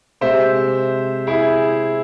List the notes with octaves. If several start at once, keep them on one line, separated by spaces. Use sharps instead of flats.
C3 G#3 C5 E5
E4 G#4